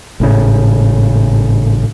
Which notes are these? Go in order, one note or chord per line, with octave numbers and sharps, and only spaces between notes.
G#1 A2 C#3